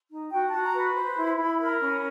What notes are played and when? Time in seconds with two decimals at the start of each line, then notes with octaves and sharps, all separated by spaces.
0.10 D#4
0.31 F#4 G5
0.47 A5
0.52 F#4
0.63 A#5
0.74 B4 B5
0.95 C5
1.16 E4
1.37 E4
1.59 A#4
1.81 C#4